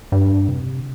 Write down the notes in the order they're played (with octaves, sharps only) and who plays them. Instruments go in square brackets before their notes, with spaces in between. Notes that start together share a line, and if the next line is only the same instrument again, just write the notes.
[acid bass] G2
C3